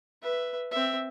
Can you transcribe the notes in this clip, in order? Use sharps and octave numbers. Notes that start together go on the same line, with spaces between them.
B4 E5
C4 E5